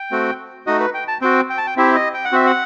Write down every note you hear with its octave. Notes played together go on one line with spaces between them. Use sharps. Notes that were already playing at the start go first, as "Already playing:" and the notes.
Already playing: G5
A3 C4 F#4
A3 D#4 F#4 D#5
B4
G5
A5
C4 F#4 G5
G5
A5
G5
C4 E4 G4 E5
D#5
G5
F#5
C4 F#4 E5
F#5